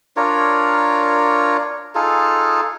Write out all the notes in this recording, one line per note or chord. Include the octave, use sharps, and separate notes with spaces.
D4 F4 A#4 C#5
D#4 F4 G#4 A4